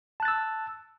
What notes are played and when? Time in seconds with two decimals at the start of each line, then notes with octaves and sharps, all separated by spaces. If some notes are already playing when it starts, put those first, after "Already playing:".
0.20 A5
0.23 F#6
0.25 A6
0.28 E6